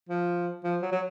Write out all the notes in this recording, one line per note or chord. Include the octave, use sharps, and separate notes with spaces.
F3
F3
F#3
F#3